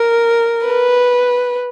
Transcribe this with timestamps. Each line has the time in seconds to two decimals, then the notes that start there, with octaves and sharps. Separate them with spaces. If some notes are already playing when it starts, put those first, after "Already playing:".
Already playing: A#4
0.66 B4